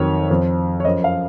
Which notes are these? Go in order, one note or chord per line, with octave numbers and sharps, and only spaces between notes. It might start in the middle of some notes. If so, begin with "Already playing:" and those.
Already playing: F2 D#3 F#3 C#5
F2 F3
C#5
F#2 F3 D#5
F5